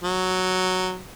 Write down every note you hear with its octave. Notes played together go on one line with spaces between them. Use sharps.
F#3